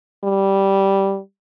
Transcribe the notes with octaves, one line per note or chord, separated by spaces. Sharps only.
G3